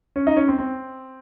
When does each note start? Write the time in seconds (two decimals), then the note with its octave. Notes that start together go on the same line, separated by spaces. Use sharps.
0.16 C#4
0.27 D#4
0.37 C#4
0.48 C4
0.59 C4